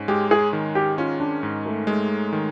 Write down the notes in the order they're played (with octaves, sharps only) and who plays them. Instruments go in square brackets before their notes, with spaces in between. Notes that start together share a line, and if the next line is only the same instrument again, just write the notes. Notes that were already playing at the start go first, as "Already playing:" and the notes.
Already playing: [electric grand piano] G#2 C#4
[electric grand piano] G#3 [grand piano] G4
[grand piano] G#4
[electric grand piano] D#3
[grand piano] G4
[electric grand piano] C#4 [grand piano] F4
[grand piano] D4
[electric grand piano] G#2
[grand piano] A3
[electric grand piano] G#3 [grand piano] A3
[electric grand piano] D#3